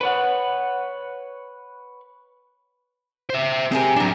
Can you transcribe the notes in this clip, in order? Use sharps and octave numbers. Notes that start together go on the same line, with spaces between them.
B4 C#5 F#5
C5 E5
C4 G4 G#4 A#4 G#5
F#3 G3 D4 A#4